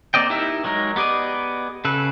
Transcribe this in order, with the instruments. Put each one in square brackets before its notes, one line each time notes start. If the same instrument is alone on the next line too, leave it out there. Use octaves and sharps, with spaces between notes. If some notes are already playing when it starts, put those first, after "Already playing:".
[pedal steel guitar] A#3 C4 D5 D#5 G5
D#4 E4 G4 A#4 E5
F#3 G#3 D#4 A#4
B3 G4 G#4 D5 D#5
C#3 A4 B4